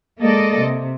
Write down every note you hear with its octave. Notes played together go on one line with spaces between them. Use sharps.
G#3 A#3 A4 D5 D#5
C3